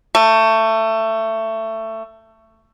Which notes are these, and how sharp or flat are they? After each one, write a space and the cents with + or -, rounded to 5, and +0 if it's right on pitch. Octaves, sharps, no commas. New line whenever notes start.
A3 +20